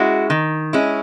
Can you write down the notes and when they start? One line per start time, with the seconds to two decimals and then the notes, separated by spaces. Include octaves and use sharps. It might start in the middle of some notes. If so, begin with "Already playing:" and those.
Already playing: G#3 C#4 E4 F#4
0.30 D#3
0.73 G#3 C#4 E4